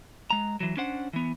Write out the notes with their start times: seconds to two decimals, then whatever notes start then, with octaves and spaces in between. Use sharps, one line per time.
0.30 G#3 A#5
0.60 E3 F#3
0.77 C#4 D4 C5 F#5
1.13 E3 B3